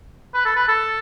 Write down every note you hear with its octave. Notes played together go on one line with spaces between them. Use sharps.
B4
A4
B4
A4